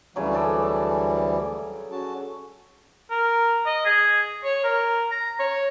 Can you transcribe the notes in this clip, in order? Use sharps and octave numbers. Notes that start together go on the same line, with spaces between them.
D2 C#3 E3 F#3 G3
C#3 A4 D5
C#4 F#4 A5
A#4
D#5
G#4
C#5
A#4
A#5
C#5